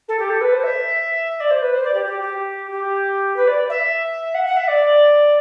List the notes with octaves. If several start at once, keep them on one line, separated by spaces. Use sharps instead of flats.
A4
G4
A4
B4
C5
E5
D5
C5
B4
C5
D5
G4
G4
G4
G4
B4
D5
E5
F#5
F#5
E5
D5